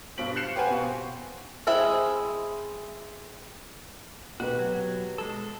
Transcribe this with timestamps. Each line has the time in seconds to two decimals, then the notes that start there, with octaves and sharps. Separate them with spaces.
0.18 G2 B2 C5 B6 D7 F#7
0.36 F#6 G6 C7 C#7 E7
0.56 G4 B4 C5 F5 F#5 G#5
0.70 B2
1.67 G#3 C4 E4 G#4 E5
4.40 B2 F#4 G4 B4
4.59 F#3
5.18 G#3 A4